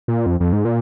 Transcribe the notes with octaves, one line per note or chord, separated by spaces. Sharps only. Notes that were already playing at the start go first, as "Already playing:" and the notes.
A#2
F2
F2
G#2
A#2